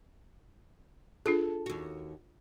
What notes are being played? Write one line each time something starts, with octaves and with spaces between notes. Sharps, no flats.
D4 F4 G#4 A4
D#2 F#4